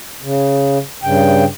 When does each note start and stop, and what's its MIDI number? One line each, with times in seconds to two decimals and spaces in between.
0.23 0.78 49
1.03 1.45 43
1.03 1.45 49
1.03 1.45 79